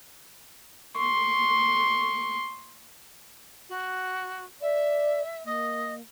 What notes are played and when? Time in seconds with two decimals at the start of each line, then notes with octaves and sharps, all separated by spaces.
0.96 C6 C#6
3.69 F#4
4.62 D5 E5
5.45 A#3 D#5